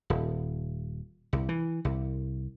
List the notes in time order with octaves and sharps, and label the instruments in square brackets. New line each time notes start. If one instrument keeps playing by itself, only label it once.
[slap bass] D#1
C2
E3
C2